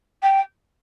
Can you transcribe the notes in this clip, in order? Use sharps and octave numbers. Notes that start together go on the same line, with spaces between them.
G5